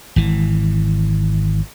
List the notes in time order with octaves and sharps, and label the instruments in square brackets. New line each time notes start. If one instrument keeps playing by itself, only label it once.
[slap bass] G#1 E3